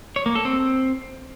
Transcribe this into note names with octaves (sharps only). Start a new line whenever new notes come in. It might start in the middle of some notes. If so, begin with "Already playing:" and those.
C#5
A#3
A4
C4